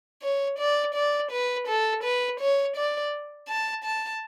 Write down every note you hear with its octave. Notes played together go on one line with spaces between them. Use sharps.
C#5
D5
D5
B4
A4
B4
C#5
D5
A5
A5